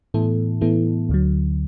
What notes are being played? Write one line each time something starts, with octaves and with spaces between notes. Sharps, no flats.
A2 E3 B3 E4 A4
A2 E3 B3 E4 A4
D2 D3 F#3